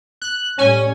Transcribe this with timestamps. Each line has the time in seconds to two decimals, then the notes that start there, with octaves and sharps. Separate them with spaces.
0.22 F#6
0.58 A2 G3 C#4 G#5